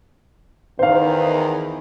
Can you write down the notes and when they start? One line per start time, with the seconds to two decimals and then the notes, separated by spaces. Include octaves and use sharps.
0.79 E2 D#3 C5 F5